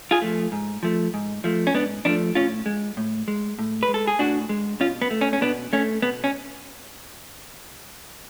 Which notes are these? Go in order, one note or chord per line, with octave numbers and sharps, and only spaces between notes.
F4 G#4
F3 A3
G#2
F3 A3
G#2
F3 A3
C#4
G#2 B3 D4
F3 A3 B3 D4
A2 C#4 F4
G#3
A2
G#3
A2
B4
G#3
A4
G#4
A2 D4 F#4
G#3
B2 C#4 F4
B3
A3
C#4
C#4
B2 B3 D4
A3 C#4
B2 B3
C#4